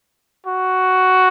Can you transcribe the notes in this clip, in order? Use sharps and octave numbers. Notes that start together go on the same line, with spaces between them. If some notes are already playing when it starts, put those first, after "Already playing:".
F#4